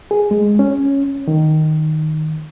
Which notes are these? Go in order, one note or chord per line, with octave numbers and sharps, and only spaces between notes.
G#4
G#3
C#4
D#3